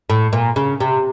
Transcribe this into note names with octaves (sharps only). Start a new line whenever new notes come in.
A2
A#2
C#3
C3